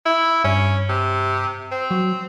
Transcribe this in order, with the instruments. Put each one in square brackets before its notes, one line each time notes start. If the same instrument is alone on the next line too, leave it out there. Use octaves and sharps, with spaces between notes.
[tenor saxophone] E4
[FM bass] G2 [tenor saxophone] C#4
[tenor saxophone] C3
C4
[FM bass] F#3